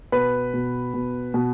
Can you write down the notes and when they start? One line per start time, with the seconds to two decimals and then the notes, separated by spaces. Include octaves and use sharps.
0.12 B2 B4
0.54 B2
0.94 B2
1.34 B2